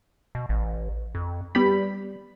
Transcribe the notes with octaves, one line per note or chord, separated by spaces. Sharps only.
B2
A1
F2
G3 B3 G4 B5